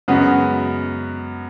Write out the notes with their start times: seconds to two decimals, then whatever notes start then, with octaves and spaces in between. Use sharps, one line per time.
0.08 F#2 C#3 G#3 B3 F#4